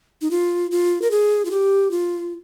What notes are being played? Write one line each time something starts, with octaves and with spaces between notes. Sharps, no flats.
D#4
F4
F4
A#4
G#4
F4
G4
F4